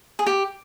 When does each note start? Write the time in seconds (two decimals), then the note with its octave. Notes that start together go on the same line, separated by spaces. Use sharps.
0.19 G#4
0.26 G4